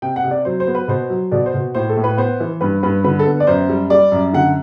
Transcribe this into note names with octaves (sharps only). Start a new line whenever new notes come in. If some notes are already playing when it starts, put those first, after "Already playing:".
C3 G5
F#5
C3
D5
F#3 C5
C5
B3
B4
B2 C5
F#3
B2 D5
C5
B2
A2 C5
A4
A2
B4
B3 C5
E3
G2 B4
G2 B4
D3 B4
A4
B3
D5
F#2 C5
G3
G3 D5
F#2
D3 F#5